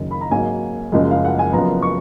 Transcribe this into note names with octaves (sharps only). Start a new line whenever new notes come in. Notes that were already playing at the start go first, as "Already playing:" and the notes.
Already playing: F#1 F#2 D#3
B5
A#5
G#1 G#2 F#3 A#3 G#5
F#1 F#2 F3 G#3
F5
F#5
G#5
F#1 F#2 F3 B3 A#5
C#6